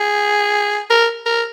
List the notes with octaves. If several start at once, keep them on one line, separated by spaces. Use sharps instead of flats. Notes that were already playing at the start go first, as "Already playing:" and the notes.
Already playing: G#4
A#4
A#4